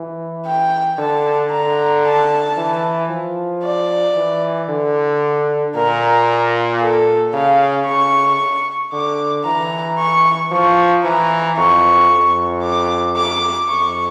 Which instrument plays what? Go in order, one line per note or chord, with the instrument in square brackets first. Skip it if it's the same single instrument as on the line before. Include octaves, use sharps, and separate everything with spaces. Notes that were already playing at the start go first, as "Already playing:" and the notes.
Already playing: [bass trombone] E3
[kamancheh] G5
[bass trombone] D3 [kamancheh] A5
[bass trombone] D3 [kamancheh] A#5
[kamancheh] A5
[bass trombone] E3
F3
[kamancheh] D5
[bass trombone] E3
D3
[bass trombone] A#2 [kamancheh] A#4
[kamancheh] A4
[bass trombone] C#3 [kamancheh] F5
[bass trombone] C#3 [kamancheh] C#6
[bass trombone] D3 [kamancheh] D6
[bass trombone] E3 [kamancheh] A#5
[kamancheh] C#6
[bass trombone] F3 [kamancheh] C#6
[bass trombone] E3 [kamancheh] A#5
[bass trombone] F2 [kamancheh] C#6
[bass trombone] F2
[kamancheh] D6
D6
[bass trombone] F2 [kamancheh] C#6